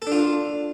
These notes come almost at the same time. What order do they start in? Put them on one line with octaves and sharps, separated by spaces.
A4 D4 F4